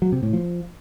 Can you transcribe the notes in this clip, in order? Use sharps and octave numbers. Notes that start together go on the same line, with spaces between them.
F#3
C3
A2
F3